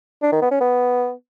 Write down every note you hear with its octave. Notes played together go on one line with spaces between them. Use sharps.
D4
D#3
B3
C#4
B3